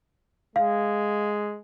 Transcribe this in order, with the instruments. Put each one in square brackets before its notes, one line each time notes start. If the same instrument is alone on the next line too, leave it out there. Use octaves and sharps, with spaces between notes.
[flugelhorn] G#3 [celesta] F5